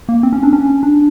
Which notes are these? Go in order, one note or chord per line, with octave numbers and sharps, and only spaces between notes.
A#3
C4
C#4
D4
C#4
D4